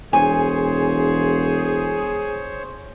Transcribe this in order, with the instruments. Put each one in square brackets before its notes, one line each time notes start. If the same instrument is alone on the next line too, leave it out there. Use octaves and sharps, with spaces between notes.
[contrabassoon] E1 [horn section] G#4 [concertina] C5 C#5 [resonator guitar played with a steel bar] G#5